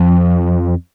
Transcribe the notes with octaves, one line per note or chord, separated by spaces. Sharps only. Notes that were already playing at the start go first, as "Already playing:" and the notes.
Already playing: F2